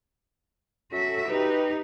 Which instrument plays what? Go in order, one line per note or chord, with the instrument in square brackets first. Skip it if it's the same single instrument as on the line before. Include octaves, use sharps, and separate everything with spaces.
[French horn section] F#3 C#4 A4 [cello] F#4 E5
[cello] D#4 [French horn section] G4 B4